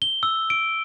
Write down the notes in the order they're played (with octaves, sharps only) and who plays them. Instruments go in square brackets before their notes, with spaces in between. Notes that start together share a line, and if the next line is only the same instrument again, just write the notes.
[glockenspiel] G7
E6
D7